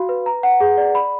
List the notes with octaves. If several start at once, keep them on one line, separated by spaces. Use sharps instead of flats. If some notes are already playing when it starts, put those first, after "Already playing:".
Already playing: F#4 F5 B5
B4
A#5
F#5
G#4
D5
B5